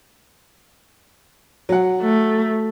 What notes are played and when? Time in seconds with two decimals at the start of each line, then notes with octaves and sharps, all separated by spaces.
1.69 F#3 F#5
2.02 A3